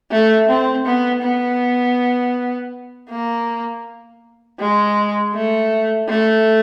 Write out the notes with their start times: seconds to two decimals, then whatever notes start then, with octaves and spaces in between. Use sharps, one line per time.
0.11 A3
0.49 C4
0.86 B3
1.23 B3
3.10 A#3
4.60 G#3
5.34 A3
6.09 A3